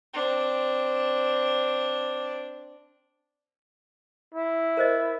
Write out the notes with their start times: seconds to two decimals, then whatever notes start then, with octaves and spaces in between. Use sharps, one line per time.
0.13 C4 D4
4.34 E4
4.77 A#4 C5 D#5